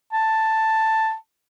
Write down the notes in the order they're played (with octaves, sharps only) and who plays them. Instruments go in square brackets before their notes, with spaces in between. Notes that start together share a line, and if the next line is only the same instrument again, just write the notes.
[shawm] A5